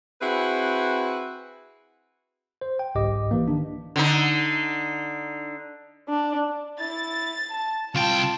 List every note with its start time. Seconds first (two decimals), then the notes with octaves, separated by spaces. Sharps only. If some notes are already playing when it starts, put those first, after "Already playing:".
0.21 C4 E4 F#4 G#4 B4
2.61 C5
2.79 G5
2.95 G1 C2 G#2 G4 D#5 D6
3.31 E3 A#3
3.48 D#3 D4
3.96 D3 D#4
6.09 D4
6.80 E4 A6
7.50 A5
7.95 C2 F4 G5 A5